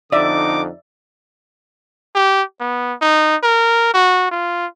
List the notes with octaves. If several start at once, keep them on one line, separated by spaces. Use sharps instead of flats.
F2 D3 D#4 D5 E5 D6
G4
B3
D#4
A#4
F#4
F4